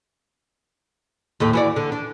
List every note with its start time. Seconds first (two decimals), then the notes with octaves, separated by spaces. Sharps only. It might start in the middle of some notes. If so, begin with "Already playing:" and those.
1.40 D#2 A2 A3
1.53 E3 F#4 D5
1.76 D3
1.92 D4